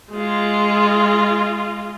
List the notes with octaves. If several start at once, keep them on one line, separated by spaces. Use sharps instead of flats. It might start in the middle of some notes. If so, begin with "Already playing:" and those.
G#3 F4